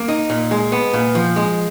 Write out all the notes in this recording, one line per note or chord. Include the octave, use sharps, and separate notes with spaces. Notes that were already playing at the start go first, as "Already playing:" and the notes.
Already playing: A#3
D#4
A#2
G#3
B3
A#2
F3
G#3